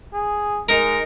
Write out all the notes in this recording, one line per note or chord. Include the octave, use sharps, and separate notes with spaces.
G#4
G#3 D#4 A#4